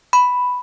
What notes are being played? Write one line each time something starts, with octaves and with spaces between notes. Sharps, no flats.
B5